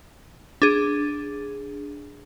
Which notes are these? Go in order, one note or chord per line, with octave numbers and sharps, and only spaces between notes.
D4 G#4